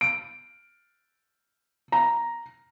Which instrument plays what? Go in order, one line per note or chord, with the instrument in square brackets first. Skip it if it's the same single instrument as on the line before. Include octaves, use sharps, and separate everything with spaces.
[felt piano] D7
A#5